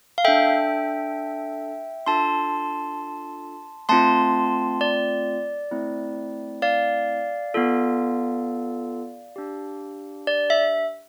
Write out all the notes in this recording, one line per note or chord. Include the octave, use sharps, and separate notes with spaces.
F5
D4 A4 E5 G5
D4 F4 A4 A5 C6
A3 C4 F4 A5 C6
D5
A3 C4 E4
D5 F5
B3 F4 A4
D4 G4
D5
E5